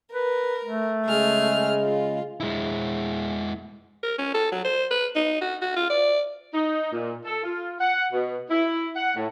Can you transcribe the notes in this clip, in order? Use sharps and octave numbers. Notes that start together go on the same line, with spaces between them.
A#4 B4
A3
C#3 G#3 G#4 F6
F4
G#3 E4
A#4
C#4
A4
F#3
C5
B4
D#4
F#4
F#4
F4
D5
D#4
A#2
A4
F4
F#5
B2
E4
F#5
A2